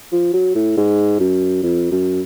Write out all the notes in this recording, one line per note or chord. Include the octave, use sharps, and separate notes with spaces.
F3
F#3
A2
G#2
F#2
F2
F#2